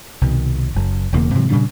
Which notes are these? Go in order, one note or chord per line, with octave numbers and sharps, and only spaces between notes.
C2 B2 D#3
F#1 F#2
E1 E2 C#3 A#3
G#2 C3 E3 F#3
A#2 C#3 G3 D4